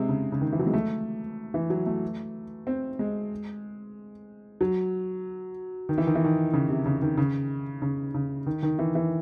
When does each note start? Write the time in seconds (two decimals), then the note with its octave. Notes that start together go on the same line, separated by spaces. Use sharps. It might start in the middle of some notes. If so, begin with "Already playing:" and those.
Already playing: C3 G#3 C4
0.09 C#3
0.32 C#3
0.41 D#3
0.52 E3
0.59 F#3
0.66 G#3
0.74 A3
1.54 E3
1.70 F#3
1.86 A3
2.67 C4
2.99 G#3
4.61 F#3
5.89 D#3
5.98 E3
6.07 D#3
6.15 E3
6.24 D#3
6.53 C#3
6.69 C3
6.86 C#3
7.02 D#3
7.18 C#3
7.82 C#3
8.15 C#3
8.46 D#3
8.63 D#3
8.79 E3
8.95 E3